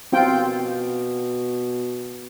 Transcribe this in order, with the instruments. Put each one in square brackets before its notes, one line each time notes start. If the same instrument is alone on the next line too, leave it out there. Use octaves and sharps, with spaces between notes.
[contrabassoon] B2 [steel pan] C4 F4 G5